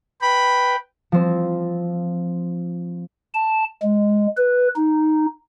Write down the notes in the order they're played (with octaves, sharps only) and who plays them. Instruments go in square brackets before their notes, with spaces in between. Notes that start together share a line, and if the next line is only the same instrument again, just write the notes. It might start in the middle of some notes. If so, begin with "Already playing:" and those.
[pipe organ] B4 G5 [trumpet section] B5
[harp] F3 C4
[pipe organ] A5
G#3
B4
D#4